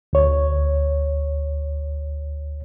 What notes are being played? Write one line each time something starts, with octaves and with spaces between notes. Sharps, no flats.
D2 C#5